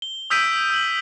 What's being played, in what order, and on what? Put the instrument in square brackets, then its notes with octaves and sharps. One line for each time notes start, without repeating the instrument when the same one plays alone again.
[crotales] G7
D#6 E6 G6 B6 D7 D#7
E6 F#7